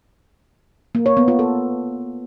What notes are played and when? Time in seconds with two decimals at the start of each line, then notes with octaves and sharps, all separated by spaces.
0.95 A#3
1.06 C#5
1.17 B3
1.28 F4
1.39 A4